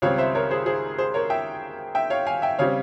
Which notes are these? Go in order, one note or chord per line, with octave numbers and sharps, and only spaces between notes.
C#2 C#3 G3 C4 C#5 F5
C5 E5
A#4 C#5
G#4 C5
G#4 C5
G#4 C5
A#4 C#5
E5 G5
E5 G5
C#5 F5
F5 G#5
E5 G5
C#3 G3 C4 C#5 F5